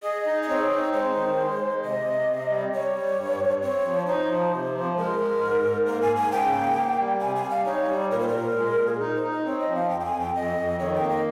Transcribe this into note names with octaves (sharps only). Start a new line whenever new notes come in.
G#4 D#5
D#4
D#5
C4 C#5
D#4
G#3 C5
D#3
G#3
G#3
C3 D#5
C3
C3
G3
G3 C#5
G3
G2
G2
C4 C#5
F3
D#4 C5
F3
C3
F3
G#3 A#4
G#3
G#2
G#2
A#3 A#4
G#5
G#2
G#5
C#3 G5
A#3
A#3
G3
C3 G#5
G#5
G3
F5
D#4 C#5
G3
A#2 A#4
C5
A#4
A#2
G#3
A#2
G#4
D#4 A#4
C5
D#4
D#5
C4 C#5
D#5
F3
F5
F2 G5
G5
G#5
F2
G5
F2 D#5
F2
D#3 C#5
G5
A#3
D#5